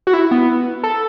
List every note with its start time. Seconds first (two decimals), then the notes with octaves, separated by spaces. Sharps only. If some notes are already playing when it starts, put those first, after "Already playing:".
0.07 F#4
0.13 E4
0.31 B3
0.83 A4